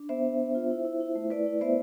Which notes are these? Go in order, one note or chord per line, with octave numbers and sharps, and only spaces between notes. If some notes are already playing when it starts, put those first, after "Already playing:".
Already playing: D4
B3 C5 E5
D4
B3
F4
E4
E4
E4
A3
E4 B4 D5
E4
B3 C5 E5